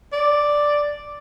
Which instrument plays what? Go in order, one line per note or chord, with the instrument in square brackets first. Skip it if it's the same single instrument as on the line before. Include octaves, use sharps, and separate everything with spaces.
[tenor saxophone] D5